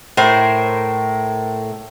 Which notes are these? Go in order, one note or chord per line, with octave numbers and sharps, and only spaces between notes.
A2 A#4 C5